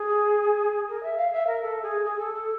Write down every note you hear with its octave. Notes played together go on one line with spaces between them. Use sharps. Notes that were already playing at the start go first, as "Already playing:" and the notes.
Already playing: G#4
A#4
E5
F5
E5
A#4
A4
G#4
G#4
A4
A4